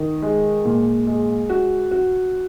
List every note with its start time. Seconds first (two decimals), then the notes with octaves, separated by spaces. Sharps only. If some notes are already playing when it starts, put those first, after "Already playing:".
Already playing: D#3 D#4
0.22 G#3
0.65 A#2
1.07 G#3
1.49 F#4
1.91 F#4